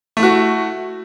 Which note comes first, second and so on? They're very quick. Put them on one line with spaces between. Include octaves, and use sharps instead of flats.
A3 E4 F#4